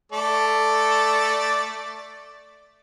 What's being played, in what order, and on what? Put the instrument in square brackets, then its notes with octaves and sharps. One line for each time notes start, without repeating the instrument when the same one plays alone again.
[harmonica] A3 A4 D5